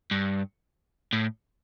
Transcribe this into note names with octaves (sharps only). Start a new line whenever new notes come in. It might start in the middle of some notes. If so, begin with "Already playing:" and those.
G2
A2